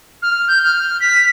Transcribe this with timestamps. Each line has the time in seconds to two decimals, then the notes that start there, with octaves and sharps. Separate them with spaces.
0.22 F6
0.48 G6
0.64 F6
1.00 B6